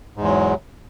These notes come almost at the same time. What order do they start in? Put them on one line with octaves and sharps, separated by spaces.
G#2 E2 G#3 F#3